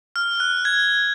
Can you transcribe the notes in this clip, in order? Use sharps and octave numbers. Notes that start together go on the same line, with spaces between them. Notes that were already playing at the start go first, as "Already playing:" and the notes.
F6
F#6
G#6